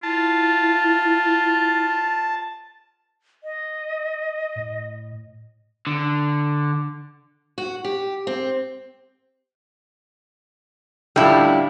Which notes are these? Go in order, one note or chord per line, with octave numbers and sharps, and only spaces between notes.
E4 F4 A5
D#5
A2
D3
F#4
G4
C4
C#2 A2 D3 G3 E4